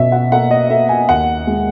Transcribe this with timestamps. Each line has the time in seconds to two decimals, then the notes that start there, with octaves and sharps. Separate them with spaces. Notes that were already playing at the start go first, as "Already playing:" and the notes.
Already playing: B2 C#4 E5
0.12 F#5
0.32 A#3 F#5
0.51 D#5
0.70 A#3 E5
0.89 G#5
1.09 D#2 F#5
1.47 G#3